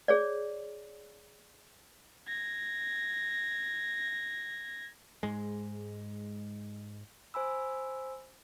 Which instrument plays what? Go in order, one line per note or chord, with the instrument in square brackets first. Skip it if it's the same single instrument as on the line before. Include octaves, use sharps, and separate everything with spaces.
[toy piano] G#4 C#5 D5
[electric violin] G#6 A#6
[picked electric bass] G#2 G#3
[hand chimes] C5 G#5 B5 E6